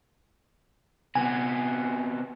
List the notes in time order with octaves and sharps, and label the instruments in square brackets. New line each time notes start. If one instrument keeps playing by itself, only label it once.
[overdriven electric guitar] C3 B3 [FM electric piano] G#5